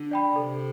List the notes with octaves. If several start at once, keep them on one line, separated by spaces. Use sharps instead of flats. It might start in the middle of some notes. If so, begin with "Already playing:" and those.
Already playing: D3
D5 G5 B5
C3 A4